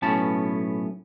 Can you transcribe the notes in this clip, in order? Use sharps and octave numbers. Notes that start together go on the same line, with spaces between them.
B1 A2 B3 C#4 A5